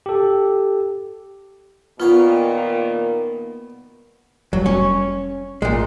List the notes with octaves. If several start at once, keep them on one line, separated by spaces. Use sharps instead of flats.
G4 A4
A#2 D#3 A#3 B3 F4 C#5 F5
F1 F#3 G3
C#4 C#5
A1 A#2 G#3